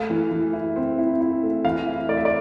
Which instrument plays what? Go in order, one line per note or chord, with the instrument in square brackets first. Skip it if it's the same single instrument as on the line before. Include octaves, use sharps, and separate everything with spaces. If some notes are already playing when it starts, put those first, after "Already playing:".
Already playing: [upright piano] A3 [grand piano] F5
[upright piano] E3
E3
E4
C4
E4
E4
A3
[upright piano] E3 [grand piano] F5
[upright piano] E4
[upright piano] A3 [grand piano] D5
[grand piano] E5
D5